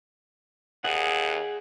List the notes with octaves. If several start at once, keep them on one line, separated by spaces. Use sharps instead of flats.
D#2 G#4 F#5